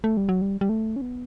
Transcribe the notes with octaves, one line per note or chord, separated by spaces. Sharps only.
A3
G3
F#3
G3
G3
A3
C#4
B3